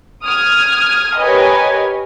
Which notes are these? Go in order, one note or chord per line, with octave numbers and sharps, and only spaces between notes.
D#6 F6 G#6
G4 A#4 B4 C#5 D#5 G#5